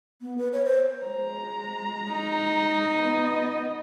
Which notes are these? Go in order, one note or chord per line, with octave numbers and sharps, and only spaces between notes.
B3
B4
C#5
C5
G#3 A#5
D#4
B3 D#5